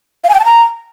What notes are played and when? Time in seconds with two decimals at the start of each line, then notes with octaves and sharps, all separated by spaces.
0.24 F5
0.29 G#5
0.34 G5
0.40 A5
0.45 A#5